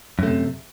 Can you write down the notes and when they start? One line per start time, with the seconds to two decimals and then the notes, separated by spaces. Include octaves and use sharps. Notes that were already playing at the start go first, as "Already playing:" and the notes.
0.19 F#2
0.23 A3
0.27 C3